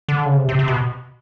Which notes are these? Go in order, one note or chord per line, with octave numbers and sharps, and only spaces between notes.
D3
C#3
C3
C3
C3
B2